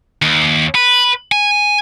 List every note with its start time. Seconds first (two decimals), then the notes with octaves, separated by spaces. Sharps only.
0.22 D#2
0.75 B4
1.32 G#5